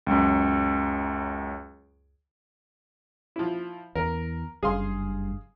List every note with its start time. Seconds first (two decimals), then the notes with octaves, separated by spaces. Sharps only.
0.07 C#2 F#2
3.36 F3 E4
3.95 E2 A#4
4.63 F#1 G2 G#4 F5 C6